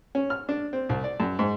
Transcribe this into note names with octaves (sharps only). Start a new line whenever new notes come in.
C#4
F6
D4
C4
C2
D5
F#2
G#2